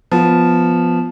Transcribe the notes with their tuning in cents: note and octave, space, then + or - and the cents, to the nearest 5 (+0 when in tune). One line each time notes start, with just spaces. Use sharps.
F3 +0 B3 +0